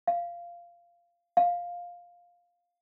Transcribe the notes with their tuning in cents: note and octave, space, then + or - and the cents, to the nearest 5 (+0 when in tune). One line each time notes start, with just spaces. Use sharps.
F5 -10
F5 +10